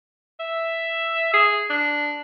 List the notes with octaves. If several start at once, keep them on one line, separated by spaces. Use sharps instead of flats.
E5
G#4
D4